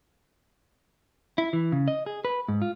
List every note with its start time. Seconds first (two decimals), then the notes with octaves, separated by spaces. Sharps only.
1.38 E4
1.53 E3
1.72 C#3
1.88 D#5
2.06 G#4
2.25 B4
2.48 G#2
2.62 F4